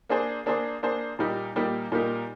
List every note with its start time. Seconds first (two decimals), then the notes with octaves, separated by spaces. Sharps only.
0.09 A#3 D4 G#4 C5
0.46 A#3 D4 G#4 C5
0.83 A#3 D4 G#4 C5
1.19 A#2 G3 A#3 D#4 G4
1.56 A#2 G3 A#3 D#4 G4
1.92 A#2 G3 A#3 D#4 G4